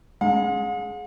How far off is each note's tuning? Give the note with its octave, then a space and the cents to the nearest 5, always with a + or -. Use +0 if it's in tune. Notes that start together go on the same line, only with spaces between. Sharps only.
G#3 +15 F#5 -45